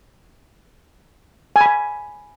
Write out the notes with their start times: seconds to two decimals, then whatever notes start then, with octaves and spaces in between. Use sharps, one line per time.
1.56 G#5
1.61 B5
1.66 G#5